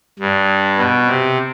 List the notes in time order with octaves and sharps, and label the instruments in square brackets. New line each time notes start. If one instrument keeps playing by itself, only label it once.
[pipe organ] G2
B2
C3